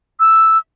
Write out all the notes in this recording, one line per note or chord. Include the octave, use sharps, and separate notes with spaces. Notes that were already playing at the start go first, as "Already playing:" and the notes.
E6